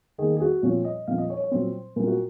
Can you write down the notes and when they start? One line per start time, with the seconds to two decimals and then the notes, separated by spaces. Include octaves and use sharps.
0.18 D#3 A#3 G#4
0.37 G#4
0.41 F#4
0.62 A#2 F3 C4 C#5
0.85 D#5
1.07 A#2 F3 C4 F5
1.18 D#5
1.30 C#5
1.40 C#5
1.51 A#2 F#3 C4 C5
1.96 A#2 F#3 C4 A#4
2.07 F#4